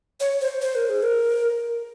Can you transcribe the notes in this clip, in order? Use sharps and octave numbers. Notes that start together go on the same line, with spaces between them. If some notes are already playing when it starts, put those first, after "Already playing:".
C#5
C5
C5
A#4
G#4
A#4